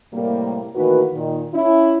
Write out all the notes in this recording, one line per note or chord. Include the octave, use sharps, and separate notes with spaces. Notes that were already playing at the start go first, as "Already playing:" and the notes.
A2 C3 G3 A#3
A2 D#3 E3 A#3 F#4 B4
A#2 D#3
C#4 E4